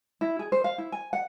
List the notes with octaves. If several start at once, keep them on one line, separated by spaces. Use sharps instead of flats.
E4
G#4
C5
F5
E4
G#5
F#5